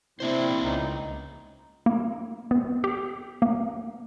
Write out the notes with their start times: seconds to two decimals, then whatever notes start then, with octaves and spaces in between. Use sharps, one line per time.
0.20 C3 A#3 C4 D4 E4 C5
0.63 C#2 D#4
1.86 A#3
2.51 B3
2.84 G4
3.42 A#3